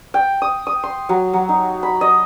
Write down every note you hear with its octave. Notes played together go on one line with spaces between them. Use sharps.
G5
D#6
D#6
C6
F#3
F#3
D#4
B5
D#5